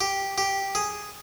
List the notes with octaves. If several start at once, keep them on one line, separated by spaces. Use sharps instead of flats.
G4
G4
G#4